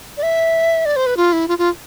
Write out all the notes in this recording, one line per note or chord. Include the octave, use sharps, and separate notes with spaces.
D5
E5
D5
C5
B4
F4
E4
F4
F4